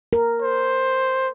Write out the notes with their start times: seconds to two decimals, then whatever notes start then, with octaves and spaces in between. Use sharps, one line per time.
0.13 A#4
0.42 C5